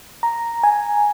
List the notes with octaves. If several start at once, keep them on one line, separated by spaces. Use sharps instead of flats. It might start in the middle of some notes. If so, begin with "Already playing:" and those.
A#5
G#5